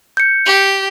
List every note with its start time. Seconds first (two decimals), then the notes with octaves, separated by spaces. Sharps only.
0.17 G6 C#7
0.46 G4